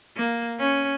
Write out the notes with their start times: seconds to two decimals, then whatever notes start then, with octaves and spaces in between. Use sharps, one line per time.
0.16 A#3
0.59 C#4